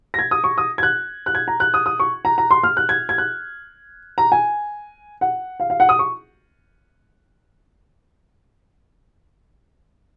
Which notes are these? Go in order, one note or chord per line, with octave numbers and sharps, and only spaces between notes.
A#6
G#6
D#6
C#6
D#6
G#6
F#6
F#6
G#6
A#5
F#6
D#6
D#6
C#6
A#5
A#5
C6
F6
F#6
G#6
G#6
F#6
A#5
G#5
F#5
F5
F5
F#5
D#6
C#6